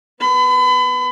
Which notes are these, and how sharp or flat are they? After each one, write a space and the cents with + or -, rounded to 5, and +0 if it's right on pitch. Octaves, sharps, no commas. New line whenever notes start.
B3 +0 B5 +35